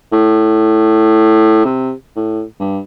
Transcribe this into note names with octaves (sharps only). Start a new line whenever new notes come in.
A2
C3
A2
G2